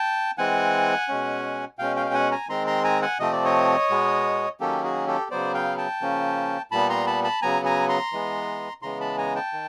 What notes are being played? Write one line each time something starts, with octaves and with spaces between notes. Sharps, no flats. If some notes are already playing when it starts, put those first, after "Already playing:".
Already playing: G5 A5
E3 G#3 C4 F#5 G#5
B2 G#3 C#4
B2 G#3 C#4 F5 G5
F5 G5
G5
F#5 G#5
G#5 A#5
D#3 G#3 C4 A#5 C6
A#5 C6
G#5 A#5
F#5 G#5
C3 F3 A3 C4 D#5
D5
C#5 D#5
B2 G#3 B3
D#3 F#3 A#3 C#4 G4 A4
F#4 G#4
G4 A4
C#3 F#3 B3 C5 D5
F5 G5
G5 A5
C#3 F3 A#3 C#4
A#2 G3 B3 A5 B5
A#5 C6
A5 B5
A5 B5
C#3 F#3 B3 G#5 A#5
G#5 A#5
A#5 C6
E3 G#3 B3
C#3 E3 G#3 B3 A#5 C6
A5 B5
G#5 A#5
G5 A5
D#3